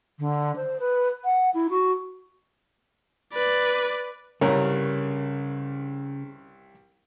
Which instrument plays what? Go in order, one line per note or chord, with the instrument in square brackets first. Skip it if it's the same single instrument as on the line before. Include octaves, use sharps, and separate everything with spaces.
[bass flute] D3
C5
B4
F#5
E4
F#4
[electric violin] B4 D5
[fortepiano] C2 G2 C#5 [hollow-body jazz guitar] C#3 [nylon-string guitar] A#4